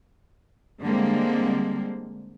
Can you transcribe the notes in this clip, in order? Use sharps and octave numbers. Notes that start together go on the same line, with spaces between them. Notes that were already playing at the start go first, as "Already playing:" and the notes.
D3 G3 G#3 A#3 C4